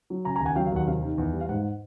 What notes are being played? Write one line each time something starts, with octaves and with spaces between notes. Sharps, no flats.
F#3
C#3 G#5 A#5
G#5 A#5
D#2
F#5 G#5
F#3 F5 G5
F5
D#2 F#5
C3 F5
D#3
E2
G3
F5
G#2 F#5